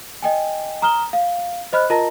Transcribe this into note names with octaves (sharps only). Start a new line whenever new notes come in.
D#5 G5 G#5
A#5 D#6 F6 E7 G7
F5
C5 D#5 B5 F6 F#6
F4 A#4 D#5 A5 A#5 A#6